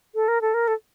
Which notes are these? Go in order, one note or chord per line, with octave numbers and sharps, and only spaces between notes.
A4
A#4
A4
A#4
A4